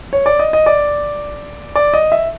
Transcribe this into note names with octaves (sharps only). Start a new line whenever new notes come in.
C#5
D5
D#5
D#5
D5
D5
D#5
E5